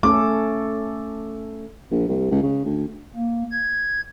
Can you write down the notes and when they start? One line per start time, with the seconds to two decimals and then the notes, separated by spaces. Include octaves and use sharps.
0.03 A3 C#4 A4 D6
1.91 A#1
2.08 C2
2.31 C#2
2.43 C#3
2.65 D2
3.15 A#3
3.52 G#6